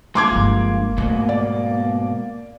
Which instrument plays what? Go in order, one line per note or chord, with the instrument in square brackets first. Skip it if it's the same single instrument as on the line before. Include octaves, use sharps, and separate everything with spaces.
[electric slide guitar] G#3 D4 F4 [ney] A#3 [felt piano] C6 D6 G#6
[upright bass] G1 F3
[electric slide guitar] G#2 B2 [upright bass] A3 B3
[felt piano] D5